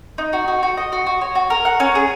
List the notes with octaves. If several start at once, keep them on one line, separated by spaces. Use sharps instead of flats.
D#4
F#4
F#4
F#4
D#5
F#4
F#4
C#5
F#4
A#4
F#5
C#4
G#4